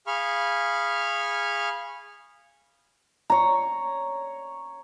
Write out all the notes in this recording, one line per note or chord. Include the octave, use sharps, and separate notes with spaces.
G#4 F5 B5 C#6 F6
C#5 A#5